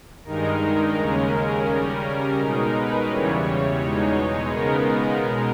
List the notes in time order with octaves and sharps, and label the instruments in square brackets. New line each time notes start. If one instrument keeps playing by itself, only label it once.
[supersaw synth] G2 D#3 G#3 D#4 A#4
D#2 C#3 G#3 C#4
C#3 G3 C#4
B2 G#3 D#4
B4
E2 C#3 E3 G3 C#5
E2 B2 G#3 D#4
C#3 G#3 B3 D#4 A#4
B2 G#3